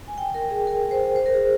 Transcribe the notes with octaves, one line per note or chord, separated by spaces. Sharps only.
G#5
G5
A#4
G#4
A#4
C5
C5
A#4
G#4